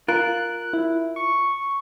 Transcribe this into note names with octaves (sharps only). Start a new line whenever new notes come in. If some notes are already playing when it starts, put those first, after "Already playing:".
F4 A#4 F#6
E4
C#6